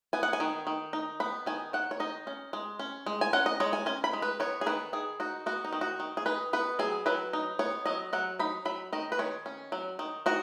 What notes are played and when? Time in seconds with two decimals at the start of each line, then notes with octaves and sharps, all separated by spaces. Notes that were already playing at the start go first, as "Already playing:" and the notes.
0.13 B3 G#5
0.23 F#5
0.33 G#5
0.40 D#3
0.67 D#3
0.93 D#4
1.20 B3 B5
1.46 D#3 G#5
1.73 D#3 F#5
1.91 C#5
2.00 D#4 D#5
2.27 C#4
2.53 G#3
2.79 C#4
3.06 G#3
3.21 G#5
3.33 C#4 F#5
3.46 D#5
3.60 G#3 C#5
3.73 G#5
3.86 C#4 G#5
4.04 B5
4.13 G#3
4.22 B4
4.40 B3 C#5
4.61 G#4
4.66 D#3 B4
4.93 D#3 G#4
5.20 D#4 F#4
5.46 B3 F#4
5.65 D#4
5.73 D#3
5.81 F#4
6.00 D#3
6.17 G#4
6.26 D#4 B4
6.53 B3 B4
6.79 F#3 G#4
7.06 F#3 B4
7.33 D#4
7.59 B3 C#5
7.86 F#3 D#5
8.13 F#3 F#5
8.39 D#4 B5
8.65 F#3 B5
8.93 D#3 D#5
9.12 B4
9.19 D#3 C#5
9.46 C#4
9.72 F#3
9.99 D#3
10.26 D#3 F#4